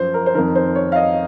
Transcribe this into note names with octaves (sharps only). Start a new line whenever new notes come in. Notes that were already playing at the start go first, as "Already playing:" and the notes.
Already playing: F#2 F3 C5
A#4
C5
F2 D#3 A#4
C5
C#5
F5
D#5